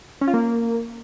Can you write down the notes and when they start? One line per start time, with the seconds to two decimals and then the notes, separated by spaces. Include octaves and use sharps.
0.21 C#4
0.27 F4
0.34 A#3